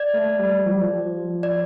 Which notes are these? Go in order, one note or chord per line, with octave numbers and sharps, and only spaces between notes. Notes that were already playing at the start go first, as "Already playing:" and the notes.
Already playing: D5
A3
G3
F3
G3
F3
D5